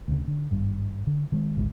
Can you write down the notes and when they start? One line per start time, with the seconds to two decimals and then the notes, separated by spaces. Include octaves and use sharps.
0.08 D2 C#3
0.28 D3
0.51 G#1 G2
1.07 D3
1.32 D#3 G#3
1.57 G#1 D2 G#3